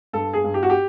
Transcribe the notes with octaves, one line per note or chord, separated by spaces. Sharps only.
G2 A4
G#4
G2
G4
F#4
G4